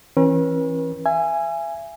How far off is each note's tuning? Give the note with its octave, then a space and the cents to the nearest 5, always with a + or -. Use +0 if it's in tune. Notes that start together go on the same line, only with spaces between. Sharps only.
E3 +0 C#4 -40 B4 -45
E5 +40 G#5 -5